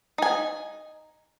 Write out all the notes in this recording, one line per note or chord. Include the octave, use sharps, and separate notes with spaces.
D#4 G#5